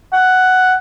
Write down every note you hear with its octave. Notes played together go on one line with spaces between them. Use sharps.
F#5